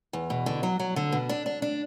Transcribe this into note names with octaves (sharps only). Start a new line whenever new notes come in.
E2
B2
D3
F#3
F#3
D3
B2
D4
D4
D4